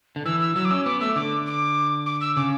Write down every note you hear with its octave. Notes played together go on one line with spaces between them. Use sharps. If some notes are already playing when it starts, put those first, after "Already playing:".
D3
E3 E6
E6
F#3 E6
D6
C#4 E6
B3 D6
A3 E6
D3 D6
D6
D6
E6
C#3 D6